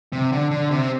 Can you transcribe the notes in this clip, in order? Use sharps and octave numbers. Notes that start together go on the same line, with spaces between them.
C3
D3
D3
C3
C4